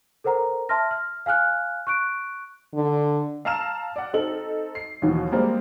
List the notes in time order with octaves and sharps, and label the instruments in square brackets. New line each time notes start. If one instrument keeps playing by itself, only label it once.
[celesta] A4 A#4 C5 F#5 A#5
E5 A5 C6 F6 A#6
F6
F5 G#5 F6 F#6
C#6 F#6 D7
[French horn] D3
[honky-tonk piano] F5 A5 A#5 E6 F6 E7
D5 F#5
C4 D#4 A4 F#7
C7
D#2 B2 E3 F3
G3 G#3 A#3 C4 D4 C5